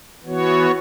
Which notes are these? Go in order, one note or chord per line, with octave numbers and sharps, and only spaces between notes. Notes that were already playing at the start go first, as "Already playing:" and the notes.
E3 B3 F#4 C#5